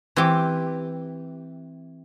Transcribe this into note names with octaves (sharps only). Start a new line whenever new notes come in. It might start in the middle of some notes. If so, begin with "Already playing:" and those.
E3 C4 G4